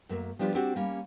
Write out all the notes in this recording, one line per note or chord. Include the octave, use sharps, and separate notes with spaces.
F#2 A3 A#3
F3 G3 B3 D4 F4 G4
C4 D4 F#4 G4 C5
G3 A#3 C#4